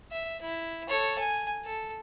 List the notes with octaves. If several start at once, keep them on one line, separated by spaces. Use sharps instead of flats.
E5
E4
A4 C#5
G#5
A4